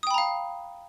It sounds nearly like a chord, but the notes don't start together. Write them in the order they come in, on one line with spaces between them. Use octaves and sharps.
D#6 G5 B5 A#5 F5